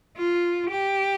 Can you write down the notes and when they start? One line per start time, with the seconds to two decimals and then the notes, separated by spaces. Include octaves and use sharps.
0.18 F4
0.71 G4